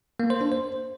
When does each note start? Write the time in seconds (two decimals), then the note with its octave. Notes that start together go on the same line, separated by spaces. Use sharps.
0.20 A#3
0.30 C5
0.41 D4
0.52 C5